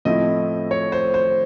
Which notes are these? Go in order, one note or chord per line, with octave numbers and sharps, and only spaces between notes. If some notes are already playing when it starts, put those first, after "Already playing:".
A2 F3 A3 C4 E4 D#5
C#5
C5
C5